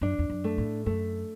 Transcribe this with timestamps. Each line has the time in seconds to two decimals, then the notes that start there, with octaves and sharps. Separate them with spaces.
0.01 F#2 D4
0.19 E2
0.30 F#2
0.44 A3
0.58 A2
0.86 F#2 A3